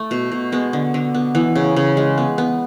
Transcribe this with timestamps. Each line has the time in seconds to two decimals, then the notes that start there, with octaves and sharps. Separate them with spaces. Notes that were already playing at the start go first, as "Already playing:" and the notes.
Already playing: A3
0.11 B2
0.32 B2
0.52 G#3 B3
0.73 D3
0.94 D3
1.15 B3
1.35 E3 B3
1.55 C#3
1.76 C#3
1.97 G#3
2.18 B3
2.38 B3